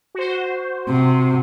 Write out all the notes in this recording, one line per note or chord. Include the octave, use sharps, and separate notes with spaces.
F#4 C5
C3